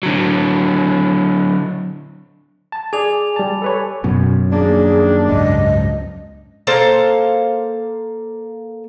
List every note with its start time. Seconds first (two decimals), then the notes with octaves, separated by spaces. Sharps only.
0.03 D3 F#3
2.72 A5
2.93 G#4 D5 G#5 D6 F7
3.36 G3 A5
3.62 A4 B4 C#5
4.04 F#2 B2 B3 C#4
4.52 D#3 G3 A#3 D4 G#4
5.29 C#2 G#2 D#5
6.67 A#3 A4 C5 F5